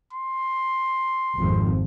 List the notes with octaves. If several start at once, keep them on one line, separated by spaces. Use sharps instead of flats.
C6
G#1 F2 F3